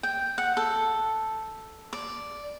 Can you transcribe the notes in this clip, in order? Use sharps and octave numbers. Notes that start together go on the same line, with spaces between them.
G5
F#5
A4
D5